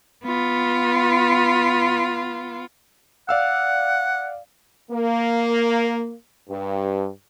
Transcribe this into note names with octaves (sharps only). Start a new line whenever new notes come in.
B3 F4
D5 F5 F#5 E6
A#3
G2